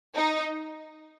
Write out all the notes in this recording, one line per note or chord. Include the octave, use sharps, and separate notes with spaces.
D#4